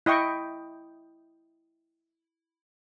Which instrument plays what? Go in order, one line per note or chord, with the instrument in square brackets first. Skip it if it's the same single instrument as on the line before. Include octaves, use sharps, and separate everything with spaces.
[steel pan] E4 D#5 G5 C#6